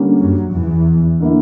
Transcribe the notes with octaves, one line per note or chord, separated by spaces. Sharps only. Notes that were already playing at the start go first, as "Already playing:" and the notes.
Already playing: D3 G3 A#3 C#4
F#2 F#3
E2 E3
D3 A#3 E4